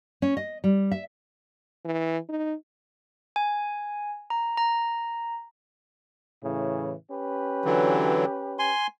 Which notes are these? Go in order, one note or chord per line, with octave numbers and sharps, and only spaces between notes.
C#4
D#5
G3
E5
E3
D#4
G#5
A#5
A#5
A2 C#3 E3
C#4 G4 B4
D3 E3 F#3
G#5 C6